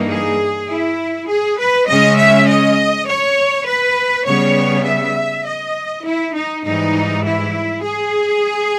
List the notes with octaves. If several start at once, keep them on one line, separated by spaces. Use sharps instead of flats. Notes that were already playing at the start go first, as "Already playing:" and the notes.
Already playing: G2 E3 A#3 D#4
G#4
E4
G#4
B4
C#3 G#3 C#4 D#5
E5
D#5
C#5
B4
C#3 G3 B3 C#5
E5
D#5
E4
D#4
G#2 E3 G3 D#4
E4
G#4